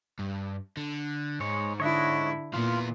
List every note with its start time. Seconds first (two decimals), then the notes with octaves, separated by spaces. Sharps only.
0.19 G2
0.77 D3
1.40 G#2 G#3 C#5
1.80 D3 E4 C#5 D#5 F#5
2.54 A#2 E3 B3 F4